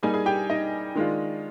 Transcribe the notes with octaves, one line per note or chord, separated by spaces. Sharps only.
G3 A#3 D#4 G#4 G#5
G#4 G#5
G4 G5
D#4 D#5
D#3 G#3 D4 F4